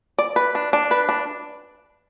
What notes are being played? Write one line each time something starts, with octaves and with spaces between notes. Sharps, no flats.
D5
B4
D4
D4
B4
D4